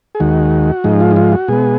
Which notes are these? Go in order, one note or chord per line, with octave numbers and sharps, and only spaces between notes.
G#4
D#2 D#3 G#3 F#4
G#2 F3 G#3 D#4
F4
D#4
F4
F#4
B2 G#3 B3 G#4